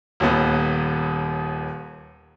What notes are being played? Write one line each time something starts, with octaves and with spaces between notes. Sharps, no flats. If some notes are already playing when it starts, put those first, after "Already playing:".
D#1 D#2 B3